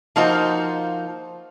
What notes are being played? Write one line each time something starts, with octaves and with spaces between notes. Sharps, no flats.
F3 A#3 D#4 F4 F#4 C5